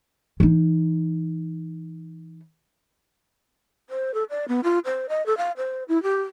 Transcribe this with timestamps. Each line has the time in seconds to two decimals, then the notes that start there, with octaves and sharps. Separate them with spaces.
0.40 E3 D#4
3.90 C5
4.14 A4
4.30 D5
4.48 B3
4.64 F4
4.85 C5
5.09 D#5
5.26 A4
5.37 F5
5.57 C5
5.88 E4
6.03 G4